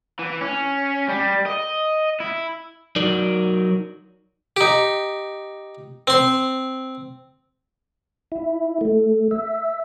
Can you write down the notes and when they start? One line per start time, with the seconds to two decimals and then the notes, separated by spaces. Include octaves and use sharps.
0.19 E3
0.41 C#4
1.08 G3
1.46 D#5
2.20 E4
2.96 F#3 D#4 A#4 D5
4.56 D#4 G4
6.07 C4 C6
8.32 E4
8.81 A3
9.31 E5